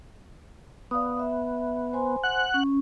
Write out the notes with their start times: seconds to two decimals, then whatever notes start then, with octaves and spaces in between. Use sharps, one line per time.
0.91 B3 D5 F5 D#6
1.19 E5
1.93 C5 G#5 C6
2.23 F#5 F#6
2.54 C#4